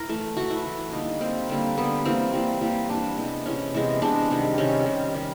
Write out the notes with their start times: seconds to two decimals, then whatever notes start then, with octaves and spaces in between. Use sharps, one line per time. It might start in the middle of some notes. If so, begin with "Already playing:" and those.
Already playing: E4 A#4
0.09 E3 A3
0.37 E3 A3 F#4
0.50 E4
0.65 E3 A3
0.92 D3 G3 A#3 D#4
1.20 D3 G3 A#3 C4
1.49 D3 G3 A#3
1.77 D3 G3 A#3 B3
2.05 E3 G3 A#3 C4
2.33 E3 G3 A#3
2.61 E3 G3 A#3
2.89 E3 G3 A#3 D4
3.17 C3 E3 G#3 B3
3.46 C3 E3 G#3 B3 C#4
3.74 C3 E3 G#3 B3
4.02 C3 E3 G#3 B3 D4
4.30 C3 D#3 G3
4.58 C3 D#3 G3 C#4
4.86 C3 D#3 G3
5.14 C3 D#3 G3